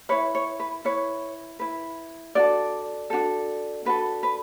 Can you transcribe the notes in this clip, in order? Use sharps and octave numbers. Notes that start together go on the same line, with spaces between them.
E4 B4 C#5
C#5
B4
E4 B4 C#5
E4 B4
D4 F#4 A4 D5
D4 F#4 A4
D4 F#4 A4 B4
B4